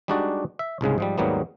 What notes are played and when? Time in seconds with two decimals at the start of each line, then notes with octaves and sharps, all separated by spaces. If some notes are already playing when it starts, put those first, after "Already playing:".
0.08 G3 G#3 D4 D#4 F#4 D5
0.59 E5
0.81 C2 G#2 C#3 G#3
0.98 G#2 F3 G3
1.18 D#2 G#2 F#3 G3 A#3 B3